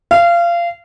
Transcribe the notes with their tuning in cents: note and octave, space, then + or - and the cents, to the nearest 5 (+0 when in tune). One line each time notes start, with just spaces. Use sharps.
F5 -25